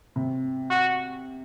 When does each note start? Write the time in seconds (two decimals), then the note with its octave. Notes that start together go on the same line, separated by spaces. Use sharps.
0.16 C3
0.70 F#4